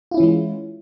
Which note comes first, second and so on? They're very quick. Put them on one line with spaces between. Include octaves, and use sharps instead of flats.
F4 E4 C#4 E3 G#3